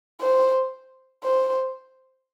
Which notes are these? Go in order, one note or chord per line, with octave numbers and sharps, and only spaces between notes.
C5
C5